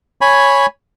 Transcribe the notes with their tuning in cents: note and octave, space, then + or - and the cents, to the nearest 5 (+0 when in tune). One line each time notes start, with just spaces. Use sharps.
C#5 +0 G#5 +0 B5 +0